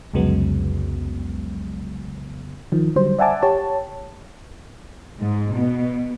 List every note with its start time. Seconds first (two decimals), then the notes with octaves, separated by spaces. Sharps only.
0.14 C2 F2 C#3 F#3 G#3 B3
2.72 D#3 F3
2.96 D3 F#3 G3 C5
3.19 D5 E5 F#5 G#5 A5 D6
3.43 G4 C#5 A5
5.18 G#2
5.54 B2